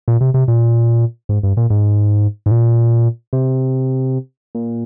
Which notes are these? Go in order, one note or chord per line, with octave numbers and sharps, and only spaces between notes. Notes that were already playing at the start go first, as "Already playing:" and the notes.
A#2
C3
C3
A#2
G#2
G2
A#2
G#2
G#2
A#2
C3
A#2